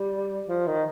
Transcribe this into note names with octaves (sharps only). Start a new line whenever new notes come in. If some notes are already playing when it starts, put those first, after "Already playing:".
Already playing: G3
F3
D#3